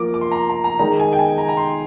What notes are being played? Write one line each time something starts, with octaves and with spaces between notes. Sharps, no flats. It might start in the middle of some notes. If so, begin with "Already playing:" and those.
Already playing: F3 A#3 F4 A#4 D6
D6
C6
A#5
C6
A#5
A#5
D#3 G#3 D#4 A#5
G#5
G5
G#5
A#5
A#5
C6